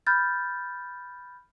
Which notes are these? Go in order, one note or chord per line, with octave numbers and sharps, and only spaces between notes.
B5 F6 G6 A6